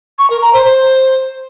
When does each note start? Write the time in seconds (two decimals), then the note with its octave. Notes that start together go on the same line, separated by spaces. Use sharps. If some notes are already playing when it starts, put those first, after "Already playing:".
0.19 C#6
0.30 A#4
0.42 A#5
0.53 C5
0.65 C5